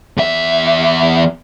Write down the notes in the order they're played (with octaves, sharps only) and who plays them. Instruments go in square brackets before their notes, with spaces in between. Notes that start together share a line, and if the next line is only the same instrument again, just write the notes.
[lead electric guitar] E2 E5